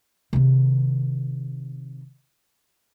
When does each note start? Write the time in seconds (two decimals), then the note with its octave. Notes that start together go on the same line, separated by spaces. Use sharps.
0.33 C3 D#3